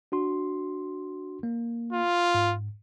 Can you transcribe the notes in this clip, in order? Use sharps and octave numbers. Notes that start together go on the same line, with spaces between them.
D4 F#4 C6
A#3
F4
G#2